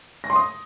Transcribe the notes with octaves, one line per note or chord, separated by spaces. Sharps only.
A#6
C6
D#6